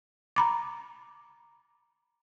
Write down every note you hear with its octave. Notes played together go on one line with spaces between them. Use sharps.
A#5 B5 D6